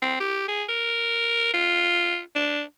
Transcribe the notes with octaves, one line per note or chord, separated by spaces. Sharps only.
C4
G4
G#4
A#4
F4
D4